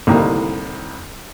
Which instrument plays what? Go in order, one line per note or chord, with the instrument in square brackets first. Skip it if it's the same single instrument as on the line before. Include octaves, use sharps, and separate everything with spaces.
[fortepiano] C2 A2 D3 D#3 G3 A#3